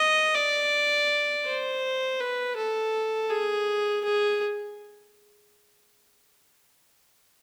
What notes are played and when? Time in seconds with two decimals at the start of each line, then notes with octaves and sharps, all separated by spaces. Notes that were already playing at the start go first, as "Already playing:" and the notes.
Already playing: D#5
0.35 D5
1.46 C5
2.20 B4
2.56 A4
3.30 G#4
4.04 G#4